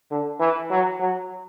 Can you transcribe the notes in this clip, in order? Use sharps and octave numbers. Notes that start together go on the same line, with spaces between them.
D3
E3
F#3
F#3